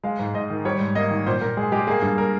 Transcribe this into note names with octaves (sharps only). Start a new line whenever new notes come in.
G#3 F5
G#2
G#2 D#5
D#3
G3 C#5
G#2
A#3 D#5
D#3
A#2 C5
A#2 A#4
G#3 G#4
G#3 G4
A#3 G#4
G2
A#4